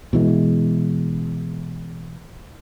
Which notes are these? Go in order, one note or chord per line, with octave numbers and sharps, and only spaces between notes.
B2 E3 G#3